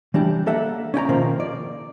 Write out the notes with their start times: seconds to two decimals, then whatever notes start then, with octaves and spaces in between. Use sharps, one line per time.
0.14 E3 G3 D4 G4
0.46 A#3 A4 E5 F#5
0.94 C#4 D5 G5 A#5
1.09 B2 D#3 F3 A#3 C4
1.40 D5